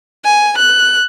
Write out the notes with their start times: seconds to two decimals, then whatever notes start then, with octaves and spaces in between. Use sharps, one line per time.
0.25 G#5
0.58 F#6